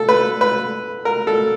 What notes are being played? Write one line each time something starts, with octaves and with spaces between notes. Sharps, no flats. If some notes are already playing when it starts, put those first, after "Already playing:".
Already playing: A4
B4
B4
A#4
A4